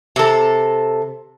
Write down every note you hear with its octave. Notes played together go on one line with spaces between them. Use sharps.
C3 A4